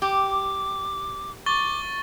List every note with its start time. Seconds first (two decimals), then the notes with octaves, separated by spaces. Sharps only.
0.02 G4 D6
1.46 C#6 D6 A6 G7